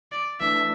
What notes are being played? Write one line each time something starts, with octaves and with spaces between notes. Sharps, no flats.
D5
E3 A3 D4 E5